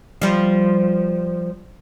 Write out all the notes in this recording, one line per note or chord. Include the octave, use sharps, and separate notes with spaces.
F3 G3